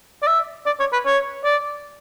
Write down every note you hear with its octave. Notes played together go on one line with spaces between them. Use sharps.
D5
E5
D5
C#5
B4
C#5
D5